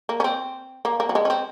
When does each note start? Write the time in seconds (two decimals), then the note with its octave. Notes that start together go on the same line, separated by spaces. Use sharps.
0.09 A#3
0.20 C#4
0.24 C4
0.85 A#3
1.00 A#3
1.09 F#3
1.15 G#3
1.25 C#4
1.30 C4